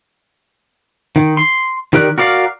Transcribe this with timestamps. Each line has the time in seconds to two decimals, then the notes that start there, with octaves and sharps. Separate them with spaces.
1.16 D#3
1.37 C6
1.93 D#3 G4 A#4 D5 F#6
2.18 F#4 A#4 D5 F5